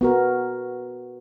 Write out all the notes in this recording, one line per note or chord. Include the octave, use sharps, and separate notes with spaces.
B3 F#4 A#4